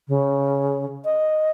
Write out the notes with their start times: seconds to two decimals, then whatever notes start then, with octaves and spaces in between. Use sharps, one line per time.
0.08 C#3
1.05 D#5